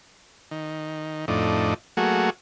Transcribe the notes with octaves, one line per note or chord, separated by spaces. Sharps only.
D#3
F2 A2 D4 D#4
F#3 A3 A#3 F#4 G#4